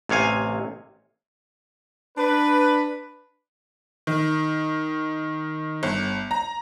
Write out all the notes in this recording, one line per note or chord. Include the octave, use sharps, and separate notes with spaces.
A1 C3 C#5 F5 G#5
D4 B4
D#3
G1
A#5